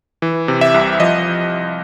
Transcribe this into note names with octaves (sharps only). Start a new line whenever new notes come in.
E3
C3
E5
C2
F3 D#5